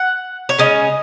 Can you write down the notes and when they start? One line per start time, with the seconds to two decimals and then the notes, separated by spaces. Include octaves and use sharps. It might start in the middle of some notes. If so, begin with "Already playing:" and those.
Already playing: F#5
0.49 C#5
0.58 C#3 G#3 C#4 D#5